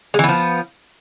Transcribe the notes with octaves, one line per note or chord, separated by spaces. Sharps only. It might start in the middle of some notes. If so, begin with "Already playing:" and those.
E3 F3 G#3 B3